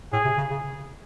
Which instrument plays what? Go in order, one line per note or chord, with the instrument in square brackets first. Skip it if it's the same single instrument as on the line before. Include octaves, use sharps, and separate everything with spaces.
[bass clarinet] A2 [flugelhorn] G#4
[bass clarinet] C3
C#3
C#3